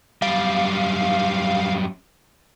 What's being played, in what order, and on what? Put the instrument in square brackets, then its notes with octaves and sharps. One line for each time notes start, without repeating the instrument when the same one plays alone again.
[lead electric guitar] F#2 G3 [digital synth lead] F5